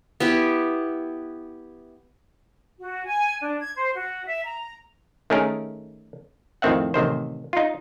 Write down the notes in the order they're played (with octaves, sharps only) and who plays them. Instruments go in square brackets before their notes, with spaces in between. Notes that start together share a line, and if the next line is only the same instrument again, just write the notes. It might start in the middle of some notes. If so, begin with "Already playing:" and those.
[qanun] B3 E4 G4
[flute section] F#4
G#5
D4
G#6
C5
F#4
E5
A#5
[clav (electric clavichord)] D#3 A3 C#4 G#4 A#4
F2 A2 D#3 C4 E5 F#5
A1 C3 D#3 C5
D#4 F4